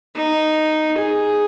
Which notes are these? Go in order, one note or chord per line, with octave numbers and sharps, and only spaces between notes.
D#4
G#4